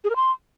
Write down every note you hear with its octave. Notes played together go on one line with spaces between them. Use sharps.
G#4
A#4
C6